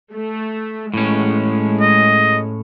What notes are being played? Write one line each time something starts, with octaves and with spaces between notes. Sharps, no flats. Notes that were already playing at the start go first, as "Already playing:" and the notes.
A3
A2 G#3 C#4
D#5